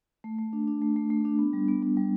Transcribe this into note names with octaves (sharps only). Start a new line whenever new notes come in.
A3
A3
D4
D4
A3
A3
A3
D4
B3
G3
B3
B3
G3